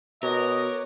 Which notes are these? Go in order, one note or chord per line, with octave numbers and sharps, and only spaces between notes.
B2 A#4 B4 C#5 D#5 D6